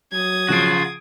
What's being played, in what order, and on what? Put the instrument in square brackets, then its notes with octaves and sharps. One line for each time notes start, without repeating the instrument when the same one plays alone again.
[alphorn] F#3 [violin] D#6 G#6
[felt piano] C#3 F3 D7 [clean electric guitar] F4 F#4